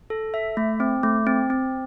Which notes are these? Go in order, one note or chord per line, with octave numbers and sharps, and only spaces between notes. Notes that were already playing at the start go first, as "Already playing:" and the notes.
A4
E5
A3
C4
A3
C4
C4